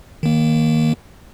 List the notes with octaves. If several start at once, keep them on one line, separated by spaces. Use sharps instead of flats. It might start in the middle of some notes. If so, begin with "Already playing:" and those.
D#3 A#3